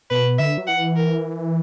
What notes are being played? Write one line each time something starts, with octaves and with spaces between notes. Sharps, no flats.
B2 B4
D3 E5
F#3
E3 F#5
A#4